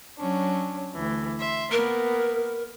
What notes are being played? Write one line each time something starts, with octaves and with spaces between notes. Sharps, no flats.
F#3 C#4 D4
D2 E3
E5 C6
A#3 B3 A#4